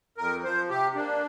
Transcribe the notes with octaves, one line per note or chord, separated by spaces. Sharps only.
F2 A#4
F3 C5
C3 G4
A#3 D4